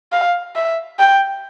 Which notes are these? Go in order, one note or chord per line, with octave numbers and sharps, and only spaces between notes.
F5
E5
G5